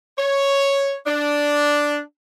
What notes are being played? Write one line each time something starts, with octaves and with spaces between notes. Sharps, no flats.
C#5
D4